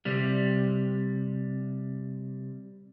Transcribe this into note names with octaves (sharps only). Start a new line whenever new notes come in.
C3 G3